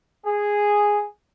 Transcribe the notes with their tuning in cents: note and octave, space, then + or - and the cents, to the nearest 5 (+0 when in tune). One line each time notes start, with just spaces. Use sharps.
G#4 -5